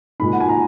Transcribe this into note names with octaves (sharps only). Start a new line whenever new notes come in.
A#2 G#3 D#4 B5
F#5
G#5
A#5